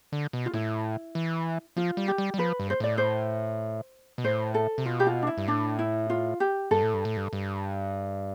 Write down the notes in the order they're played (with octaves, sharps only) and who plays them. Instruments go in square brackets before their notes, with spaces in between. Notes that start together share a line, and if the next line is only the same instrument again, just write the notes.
[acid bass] D3
B2
[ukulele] F4
[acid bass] A2 [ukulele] E4
[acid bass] E3
[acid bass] F3 [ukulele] F4
[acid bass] G3
[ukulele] G4
[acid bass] G3
G3
[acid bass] F3 [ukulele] B4
[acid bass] G2
[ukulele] C5
[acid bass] A2 [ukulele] D5
[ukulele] C5
[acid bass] B2
[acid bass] A2 [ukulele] C5
[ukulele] A4
[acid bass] C3
[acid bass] B2 [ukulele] F4
[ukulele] G4
F4
D4
E4
[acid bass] G2
[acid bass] A2 [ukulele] D4
[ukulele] E4
F4
G4
[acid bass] G2 [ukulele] A4
[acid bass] A2
G2
A2
G2
G2